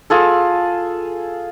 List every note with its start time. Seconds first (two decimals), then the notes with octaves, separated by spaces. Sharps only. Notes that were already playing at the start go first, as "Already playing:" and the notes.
0.10 F4 G#4 A4